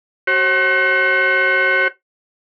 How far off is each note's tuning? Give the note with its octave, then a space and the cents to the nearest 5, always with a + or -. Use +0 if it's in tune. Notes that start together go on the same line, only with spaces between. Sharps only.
F#4 +35 C5 +45